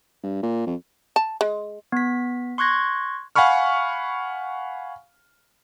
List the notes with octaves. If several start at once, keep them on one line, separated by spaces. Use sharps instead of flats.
G2
A#2
F2
A5
G#3
B3 B6
C6 C#6 F#6 G#6 A#6
F5 F#5 G#5 B5 C#6 F6